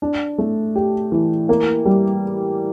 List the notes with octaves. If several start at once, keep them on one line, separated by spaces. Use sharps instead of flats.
D4
A3
G4
E3
A#3
G3